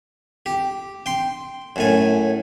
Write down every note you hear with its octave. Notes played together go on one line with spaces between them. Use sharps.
G4
G5 C6
F#2 A2 G#5